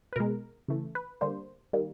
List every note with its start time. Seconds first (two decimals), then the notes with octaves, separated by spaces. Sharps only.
0.13 B4
0.16 B2 G#3 A#4
0.68 C#3 E3 A3
0.95 B4
1.21 D3 G3 A#3 C5
1.73 D#3 G3 A#3